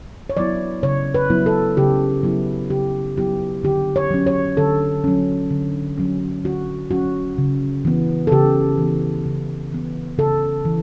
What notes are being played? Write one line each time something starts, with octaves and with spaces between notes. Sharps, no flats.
C#5
F#3 B3 E4 D5
C#3 C#5
B4
F#3 B3 E4
A4
C#3 G4
F#3 B3 E4
C#3 G4
F#3 B3 E4 G4
D3 G4
C#5
F#3 C#4
C#5
D3 A4
F#3 C#4
D3
F#3 C#4
D3 F#4
F#3 C#4 F#4
C#3
E3 B3
A4
C#3 G4
E3 B3
C#3
E3 B3
C#3 A4
E3